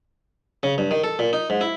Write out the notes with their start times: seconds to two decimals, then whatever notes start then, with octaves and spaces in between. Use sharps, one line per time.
0.63 C#3
0.78 G2
0.91 D#3
1.04 A4
1.19 A#2
1.33 D#4
1.50 G#2
1.61 E4